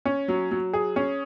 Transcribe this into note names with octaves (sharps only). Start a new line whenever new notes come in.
C#4
F#3
F#3
G#4
C#4